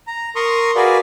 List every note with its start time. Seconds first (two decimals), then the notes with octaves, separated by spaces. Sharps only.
0.07 A#5
0.36 A#4 A#5 C6 C#6 D#6
0.76 F#4 G#4 A#4 B4 D5 F5